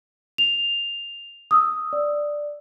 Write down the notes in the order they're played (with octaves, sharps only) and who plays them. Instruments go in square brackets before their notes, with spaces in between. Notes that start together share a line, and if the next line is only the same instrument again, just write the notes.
[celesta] F7
D#6 E6
D5